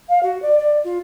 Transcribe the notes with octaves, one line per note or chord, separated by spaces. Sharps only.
F5
F#4
D5
D5
F4